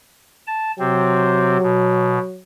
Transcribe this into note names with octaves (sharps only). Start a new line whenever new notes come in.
A5
C3 F#3 C4
B2